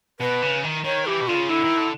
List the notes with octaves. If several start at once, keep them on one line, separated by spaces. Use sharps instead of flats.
B2 B4
C#3
D#3
D#3 C#5
E3 G4
B2
D3 F4
C#3
D3 E4
D#3
D3